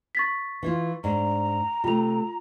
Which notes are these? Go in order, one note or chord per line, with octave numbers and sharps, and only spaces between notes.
C#6 A6 B6
E3 E4 F4
G#2 D4 A#5
C3 A3 F4 F7